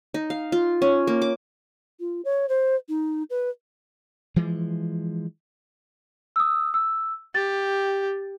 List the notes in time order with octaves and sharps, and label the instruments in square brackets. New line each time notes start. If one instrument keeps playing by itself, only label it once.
[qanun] D#4
F5
F4
C#4
A#3
D6
[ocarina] F4
C#5
C5
D#4
B4
[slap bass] E3 F3 G#3
[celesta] D#6 E6
E6
[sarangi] G4 [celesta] A6